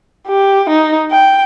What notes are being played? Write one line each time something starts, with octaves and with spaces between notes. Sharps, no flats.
G4
D#4
G5